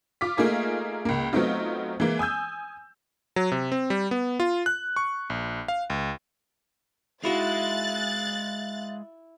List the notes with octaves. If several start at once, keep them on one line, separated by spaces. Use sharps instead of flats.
F4 D6 B6
A3 A#3 D#4 F4 G#4 A#4
C#2 A#3
F#3 A3 B3 C4 D#4 F4
E3 G#3 A#3
G#5 D#6 E6 G6
F#3
C3
C4
G3
B3
F4
F#6
C#6
A#1
F5
C#2
G#3 D#4 E4 F#4 E5 F5 F#6 A6